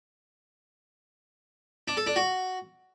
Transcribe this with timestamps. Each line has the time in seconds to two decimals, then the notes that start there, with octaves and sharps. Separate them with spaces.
1.88 D4
1.97 A4
2.07 D4
2.16 F#4